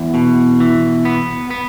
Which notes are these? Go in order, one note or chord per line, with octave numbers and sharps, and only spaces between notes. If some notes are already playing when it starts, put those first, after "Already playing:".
Already playing: E2
B2
E3
B3
B3